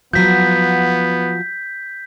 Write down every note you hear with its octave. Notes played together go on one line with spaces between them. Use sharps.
F3 F#3 B3 G6 B6